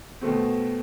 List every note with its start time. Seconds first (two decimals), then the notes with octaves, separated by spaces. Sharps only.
0.21 B2 A3 C4